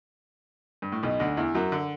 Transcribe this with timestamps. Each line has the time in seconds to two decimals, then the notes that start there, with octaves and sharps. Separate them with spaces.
0.82 G2
0.92 A2
1.03 B1 B2
1.20 D2 D3
1.37 E2 E3
1.54 F#2 F#3
1.72 D3